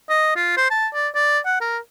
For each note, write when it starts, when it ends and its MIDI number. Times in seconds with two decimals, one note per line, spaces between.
0.10 0.32 75
0.36 0.53 65
0.57 0.69 72
0.70 0.87 81
0.94 1.08 74
1.15 1.39 74
1.46 1.56 78
1.61 1.78 70